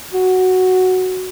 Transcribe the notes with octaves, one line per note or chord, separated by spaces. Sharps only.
F#4